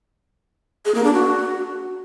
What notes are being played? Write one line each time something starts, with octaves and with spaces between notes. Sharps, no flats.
G#4
A#3
D4
F#4